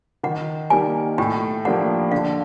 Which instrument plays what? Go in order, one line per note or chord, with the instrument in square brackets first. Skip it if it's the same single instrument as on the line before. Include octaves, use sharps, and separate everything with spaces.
[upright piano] D#3 [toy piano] F#5
[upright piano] G3 A#3 D#4 [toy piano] G#5
[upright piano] A2 [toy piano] G5
[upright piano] F3 A#3 D4 G4 [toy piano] F#5
[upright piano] D3 [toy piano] F5